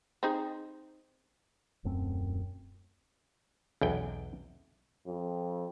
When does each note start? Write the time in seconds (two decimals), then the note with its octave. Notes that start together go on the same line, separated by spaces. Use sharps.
0.23 C4 D#4 G#4
1.84 D#1 F#2 A3 C4
3.81 B1 E2 G5
5.07 F2